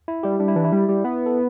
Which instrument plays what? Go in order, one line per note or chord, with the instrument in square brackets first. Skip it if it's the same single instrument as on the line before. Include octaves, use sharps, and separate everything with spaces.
[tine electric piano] E4
[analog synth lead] G3 [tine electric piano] G4
[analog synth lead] G3 [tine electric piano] D4
[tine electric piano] E4
[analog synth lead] E3 [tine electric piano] D4
[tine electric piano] E4
[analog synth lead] G3
G3
B3
[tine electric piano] A4